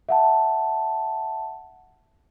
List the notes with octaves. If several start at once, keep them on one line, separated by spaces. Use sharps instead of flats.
E5 F#5 A5